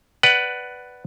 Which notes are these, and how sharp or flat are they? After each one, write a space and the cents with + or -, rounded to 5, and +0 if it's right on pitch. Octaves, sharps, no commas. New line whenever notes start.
B4 +0 D5 +0 F#5 +20